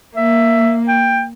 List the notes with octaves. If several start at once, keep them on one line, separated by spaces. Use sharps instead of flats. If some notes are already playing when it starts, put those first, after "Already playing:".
A#3 E5
G5